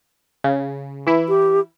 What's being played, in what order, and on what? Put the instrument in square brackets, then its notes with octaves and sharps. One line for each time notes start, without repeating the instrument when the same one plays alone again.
[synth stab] C#3
E3 E4
[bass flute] G4